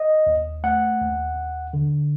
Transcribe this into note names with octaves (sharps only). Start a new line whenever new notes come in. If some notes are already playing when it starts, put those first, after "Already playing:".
Already playing: D#5
D#2
A3 F#5
D#2
D#2
D3